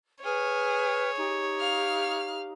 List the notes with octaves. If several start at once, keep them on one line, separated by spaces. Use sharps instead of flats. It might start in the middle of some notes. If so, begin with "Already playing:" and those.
G#4 B4 C#5 F6
D#4 G4
F5 F6